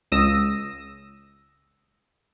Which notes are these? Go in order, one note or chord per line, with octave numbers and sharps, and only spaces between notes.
C#2 D#6 E6 A#6